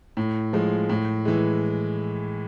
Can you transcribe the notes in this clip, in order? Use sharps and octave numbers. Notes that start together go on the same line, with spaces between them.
A2
F3 G#3
A2
E3 G#3